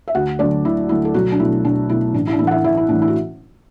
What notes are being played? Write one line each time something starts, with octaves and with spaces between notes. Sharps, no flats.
E5
D2 F#4 F#5
D3 F#3 A3 D4 D5
D2 E4
D3 F#3 A3 E4
A4
B1 F#3 F#4
D4
B2 A3 E4
B1 D4
B2 A3 E4
A1 D4
E4
D4
A2 E3 A3 E4
F#5
E4 E5
A1 E4 E5
E4
A2 E3 A3 D4
E4
F#4